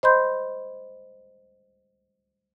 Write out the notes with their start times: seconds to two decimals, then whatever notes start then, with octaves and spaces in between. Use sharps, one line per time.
0.03 C5 D#5 B5 C6 G6